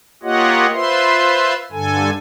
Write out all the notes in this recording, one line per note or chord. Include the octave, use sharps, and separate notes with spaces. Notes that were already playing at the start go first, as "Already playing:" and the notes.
A#3 F4 G4 C#5 D#5 F#5
F4 B4 C5 E5 C6
G2 D3 A4 G#5